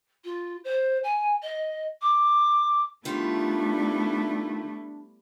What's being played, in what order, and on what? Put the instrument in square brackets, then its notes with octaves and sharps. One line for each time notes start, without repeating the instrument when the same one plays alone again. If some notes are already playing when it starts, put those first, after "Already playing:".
[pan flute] F4
C5
G#5
D#5
D6
[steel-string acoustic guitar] D#3 F4 [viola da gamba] G3 B3 E4 [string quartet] A3 [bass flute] D4